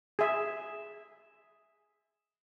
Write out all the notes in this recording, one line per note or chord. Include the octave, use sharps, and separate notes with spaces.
G#4 E5